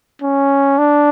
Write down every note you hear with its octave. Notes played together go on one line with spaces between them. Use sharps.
C#4
D4